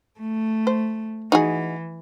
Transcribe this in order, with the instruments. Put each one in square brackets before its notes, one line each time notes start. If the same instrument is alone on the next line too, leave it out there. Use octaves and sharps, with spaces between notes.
[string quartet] A3
[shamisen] C5
[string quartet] E3 [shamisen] D#4 F#4 G#4